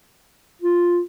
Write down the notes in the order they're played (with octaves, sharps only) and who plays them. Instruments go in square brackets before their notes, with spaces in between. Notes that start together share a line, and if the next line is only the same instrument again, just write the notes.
[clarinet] F4